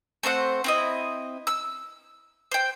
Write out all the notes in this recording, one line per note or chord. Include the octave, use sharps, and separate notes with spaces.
A3 C4 C5 F#5
C4 E4 D#5
E6
C5 G5